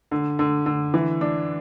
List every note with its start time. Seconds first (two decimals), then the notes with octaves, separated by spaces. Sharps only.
0.11 D3
0.39 D3
0.66 D3
0.94 E3
1.21 D4